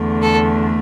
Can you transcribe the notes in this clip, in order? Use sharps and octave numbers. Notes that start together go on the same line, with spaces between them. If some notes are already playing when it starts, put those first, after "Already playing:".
Already playing: E2 D3 A3
A4